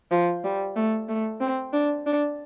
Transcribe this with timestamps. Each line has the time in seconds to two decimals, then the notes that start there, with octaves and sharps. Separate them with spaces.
0.11 F3
0.44 G3
0.76 A3
1.09 A3
1.40 C4
1.73 D4
2.06 D4